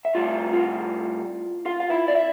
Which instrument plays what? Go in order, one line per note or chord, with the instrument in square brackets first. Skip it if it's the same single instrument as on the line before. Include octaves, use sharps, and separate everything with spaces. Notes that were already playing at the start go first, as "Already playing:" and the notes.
[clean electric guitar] E5
A2 G3 F4 F5
F4 F5
F4 F5
F5
E4 E5
D5
E4 E5